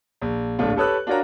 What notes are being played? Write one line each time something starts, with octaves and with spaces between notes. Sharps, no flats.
A#1
D1 A#1 A2 A3 D4 F4
G4 A4 B4 C#5 E6 F#6
D4 F4 F#4 A#4 C#5 A#5